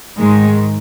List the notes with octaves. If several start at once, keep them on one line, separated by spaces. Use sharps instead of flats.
G#2 D#3 G#3